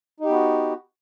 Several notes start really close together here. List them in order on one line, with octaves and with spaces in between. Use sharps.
D#4 G4 B3 F#4